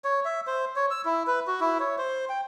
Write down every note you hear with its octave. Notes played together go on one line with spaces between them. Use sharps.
C#5
E5
C5
C#5
E6
E4
B4
F#4
E4
C#5
C5
G5